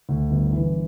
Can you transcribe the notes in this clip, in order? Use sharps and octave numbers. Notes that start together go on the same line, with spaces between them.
D2
G1
E3